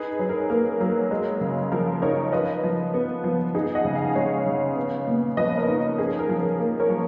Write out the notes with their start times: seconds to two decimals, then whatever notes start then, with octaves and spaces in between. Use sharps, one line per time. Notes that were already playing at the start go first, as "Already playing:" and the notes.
Already playing: D#4 G#4 B4
0.19 F#3
0.29 A#4
0.50 A#3 A#4
0.80 F#3
1.11 G#3
1.41 C#3
1.72 F3 A#4
2.02 D#4 A#4 C#5
2.32 F4 B4 D#5
2.63 F3
2.94 B3
3.24 F3
3.55 D#4 G#4
3.75 D#5 F#5
3.85 C#3
3.95 F5 G#5
4.15 G#3 C#5 F5
4.46 C#3
4.76 B3
5.07 A#2
5.37 F3 B4 D#5
5.58 A#4 C#5
5.68 D#4
5.98 C#4 G#4
6.19 A#4
6.29 F3
6.39 A#4
6.59 A#3
6.80 A#4 C#5
6.90 F3